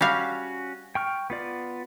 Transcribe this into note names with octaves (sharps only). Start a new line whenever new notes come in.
G3 C#4 F#4 F5
G5 C#6 F6
B3 F4 D5